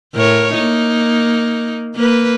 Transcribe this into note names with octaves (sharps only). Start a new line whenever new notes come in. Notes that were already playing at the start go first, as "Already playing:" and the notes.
A2 A#4 C#5
A#3 D#4
A#3 B4